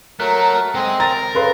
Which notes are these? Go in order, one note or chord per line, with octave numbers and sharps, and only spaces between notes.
F#3 A3 A#4 F#6
G#3 C4 D#5
A#4 A#5 A6
C#3 A4 B4 C6